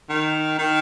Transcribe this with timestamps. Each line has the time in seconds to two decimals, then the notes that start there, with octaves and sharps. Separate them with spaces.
0.09 D#3
0.58 D#3